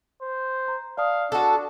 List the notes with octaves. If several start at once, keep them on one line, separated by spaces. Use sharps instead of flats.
C5
A#5
D5 F5 A5 D#6
D4 F#4 A4